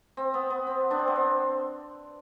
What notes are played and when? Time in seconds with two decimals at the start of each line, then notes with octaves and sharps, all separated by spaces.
0.17 C4
0.34 B3
0.50 B3
0.67 C4
0.90 B3 D4
0.99 C4
1.08 B3
1.16 C4